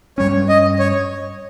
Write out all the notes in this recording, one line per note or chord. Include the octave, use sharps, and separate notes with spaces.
G2 G3 C#4 C#5
D#5
C#5